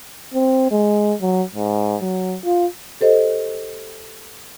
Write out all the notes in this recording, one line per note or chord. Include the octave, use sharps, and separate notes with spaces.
C4
G#3
F#3
G#2
F#3
F4
G4 A4 C5 D#5